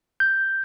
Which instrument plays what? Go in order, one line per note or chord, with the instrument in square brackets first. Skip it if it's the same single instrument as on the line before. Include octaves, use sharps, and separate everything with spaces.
[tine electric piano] G6